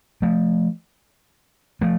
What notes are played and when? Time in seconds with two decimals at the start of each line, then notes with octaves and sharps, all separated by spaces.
0.22 F3 A3
1.81 F3 A3